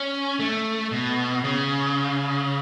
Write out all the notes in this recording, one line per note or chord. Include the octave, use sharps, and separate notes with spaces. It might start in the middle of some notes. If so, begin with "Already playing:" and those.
Already playing: C#4
A3
B2
C#3